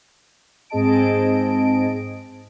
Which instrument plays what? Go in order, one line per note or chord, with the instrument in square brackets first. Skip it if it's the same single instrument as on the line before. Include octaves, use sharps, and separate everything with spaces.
[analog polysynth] G#2 C4 G#4 D#5 A5 D7